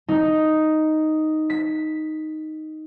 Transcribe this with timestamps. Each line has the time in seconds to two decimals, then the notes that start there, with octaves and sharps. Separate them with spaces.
0.08 D#4
1.50 B6